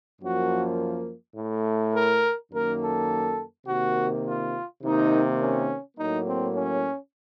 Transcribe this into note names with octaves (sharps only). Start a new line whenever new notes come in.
F#2 F3 A#3 F#4
A2 A3
A#4
F#2 D#3 A#3 A#4
A4
C3 D#3 A#3 F#4
F4
C3 D#3 A#3 D#4
C#4
A2 F#3 A#3 D#4
C4
C#4